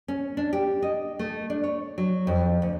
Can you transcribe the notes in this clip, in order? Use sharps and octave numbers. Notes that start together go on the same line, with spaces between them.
C#4
D4
G4
D#5
A3
D4
C#5
F#3
F2
D2